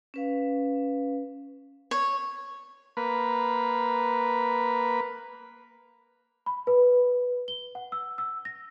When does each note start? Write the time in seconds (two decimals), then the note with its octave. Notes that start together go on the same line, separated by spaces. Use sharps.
0.14 C#4 B4 F5
1.91 C#5
2.97 A#3 B4
6.46 B5
6.67 B4
7.48 G7
7.75 F#5
7.92 E6
8.18 E6
8.45 A#6